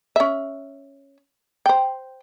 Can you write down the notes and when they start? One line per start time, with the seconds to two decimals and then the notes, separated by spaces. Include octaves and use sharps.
0.16 C#4 E5
1.66 C5 G5